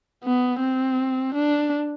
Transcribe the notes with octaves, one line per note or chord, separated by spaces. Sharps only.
B3
C4
D4